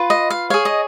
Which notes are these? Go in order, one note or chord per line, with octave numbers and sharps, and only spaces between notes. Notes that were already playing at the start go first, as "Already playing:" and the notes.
Already playing: F4 B4
D#5
F5
G#4 C#5 F5
D#5